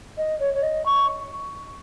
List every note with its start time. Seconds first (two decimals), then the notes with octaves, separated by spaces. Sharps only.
0.17 D#5
0.40 C#5
0.54 C#5
0.63 D#5
0.86 C#6